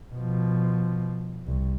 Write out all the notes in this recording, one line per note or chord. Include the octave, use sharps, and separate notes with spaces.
B2 F3
C2